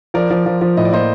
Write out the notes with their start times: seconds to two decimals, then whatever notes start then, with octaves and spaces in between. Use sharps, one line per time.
0.14 F3 A#4 D5
0.31 F3
0.46 F3
0.61 F3
0.77 A2 D#5
0.85 D5
0.92 A#3 C5 D#5